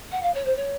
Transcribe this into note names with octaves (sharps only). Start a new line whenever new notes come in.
F#5
F5
C#5
C5
C#5